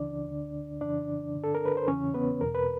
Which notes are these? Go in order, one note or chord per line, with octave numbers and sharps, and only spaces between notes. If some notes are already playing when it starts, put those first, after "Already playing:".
Already playing: C#2 C#3 E3 D4 D5
D2 D3
F2 C#3 E3 D4 D5
G2 D3
A4
A#4
B4
C5
E2 C#3 E3 C#4 C#5
B3 B4
E2 B2 A#4
B4